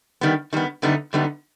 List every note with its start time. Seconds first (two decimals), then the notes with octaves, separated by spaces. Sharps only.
0.21 D#3 G3 B3
0.53 D#3 G3 B3
0.82 F#2 D3 G3 B3 D#4
1.13 F#2 D3 G3 B3 D#4